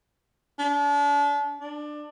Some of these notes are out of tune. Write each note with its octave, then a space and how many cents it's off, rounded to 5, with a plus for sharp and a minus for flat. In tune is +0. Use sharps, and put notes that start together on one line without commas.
D4 -35
D4 +20